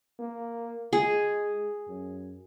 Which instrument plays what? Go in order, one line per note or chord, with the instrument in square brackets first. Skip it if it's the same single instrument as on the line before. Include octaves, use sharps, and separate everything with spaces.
[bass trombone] A#3
[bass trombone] G#3 [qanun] G#4
[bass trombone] F#2